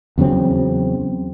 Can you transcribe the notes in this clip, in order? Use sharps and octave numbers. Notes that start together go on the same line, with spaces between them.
E2 C#3 F#3 C4